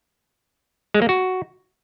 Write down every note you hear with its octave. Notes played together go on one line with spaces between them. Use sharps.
G#3
A#3
F#4